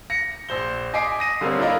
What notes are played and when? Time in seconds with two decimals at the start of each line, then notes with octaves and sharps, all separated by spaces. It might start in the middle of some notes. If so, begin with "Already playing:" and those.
0.10 A#6 C#7
0.49 A#1 C5 G7
0.94 D#5 G#5 D6 B6 C7 D7
1.19 D#6 A#6 D#7
1.41 D3 G3 A#3 C4 A#4 C#5
1.59 D4 E4 F4 A4 A#4 D#5